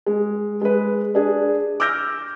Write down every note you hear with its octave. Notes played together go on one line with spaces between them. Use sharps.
G#3
G#3 B4
D4 G#4
D6 E6 F6 G6 A#6 D7